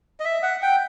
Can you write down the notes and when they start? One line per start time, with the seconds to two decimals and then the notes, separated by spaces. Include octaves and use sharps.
0.20 D#5
0.25 E5
0.43 F#5
0.62 G5